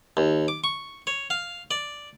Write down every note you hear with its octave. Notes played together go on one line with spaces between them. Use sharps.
D#2
D6
C#6
C#5
F5
D5